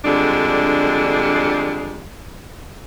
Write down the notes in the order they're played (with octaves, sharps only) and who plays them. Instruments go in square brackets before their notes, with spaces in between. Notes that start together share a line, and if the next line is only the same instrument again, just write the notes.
[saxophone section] F2 D3 G3 G#3 D4